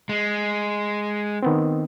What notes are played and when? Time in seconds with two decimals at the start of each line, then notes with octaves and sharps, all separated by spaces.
0.09 G#3
1.42 D#3 B3 C4